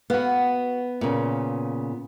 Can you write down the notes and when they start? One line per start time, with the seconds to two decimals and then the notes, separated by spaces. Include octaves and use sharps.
0.10 B3 F#4 F5
1.01 A#2 C#3